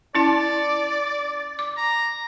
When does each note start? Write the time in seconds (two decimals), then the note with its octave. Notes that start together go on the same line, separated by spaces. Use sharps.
0.15 C#4 E4 D5 A5
1.59 D6
1.77 A#5